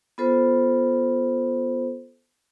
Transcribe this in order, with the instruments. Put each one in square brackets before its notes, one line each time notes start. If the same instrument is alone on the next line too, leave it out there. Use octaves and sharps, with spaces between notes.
[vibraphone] B3 F4 A4 C5